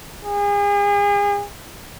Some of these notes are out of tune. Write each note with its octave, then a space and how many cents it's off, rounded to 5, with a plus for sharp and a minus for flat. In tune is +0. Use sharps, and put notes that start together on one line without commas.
G#4 -35